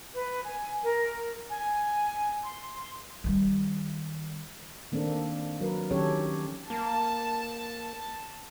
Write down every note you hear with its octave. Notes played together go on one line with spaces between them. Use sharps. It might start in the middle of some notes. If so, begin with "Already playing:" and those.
B4
G#5
A#4
G#5
C6
D#3 G3
D#3 A#3 C4 D4 A4
F#3 A#4 B4
D#3 F#3 C#4 G4 A4 C#5
A#3 A5